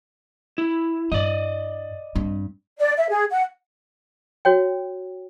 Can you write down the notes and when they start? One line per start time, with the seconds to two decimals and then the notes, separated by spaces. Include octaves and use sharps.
0.58 E4
1.12 G2 E4 D5 D#5
2.15 G2 C4
2.80 D5
2.98 E5
3.10 G#4
3.31 F#5
4.45 F#4 C#5 G5